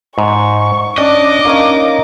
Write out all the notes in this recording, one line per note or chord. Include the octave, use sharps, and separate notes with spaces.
G#2 C#6
C#4 D4 D#5 D6
A#3 C#4 D#4 F5